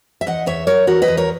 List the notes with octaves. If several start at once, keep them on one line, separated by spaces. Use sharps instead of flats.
E5
E2 D#5 F#5
E2 C#5 E5
F#3 A#4 C#5
E2 F#4 A#4
B4 D#5
E2
A#4 C#5